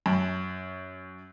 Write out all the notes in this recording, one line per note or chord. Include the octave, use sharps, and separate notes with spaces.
F#2